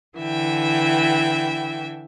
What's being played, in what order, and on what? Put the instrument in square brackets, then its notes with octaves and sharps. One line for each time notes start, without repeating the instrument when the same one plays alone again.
[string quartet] D3 E3 E5 G5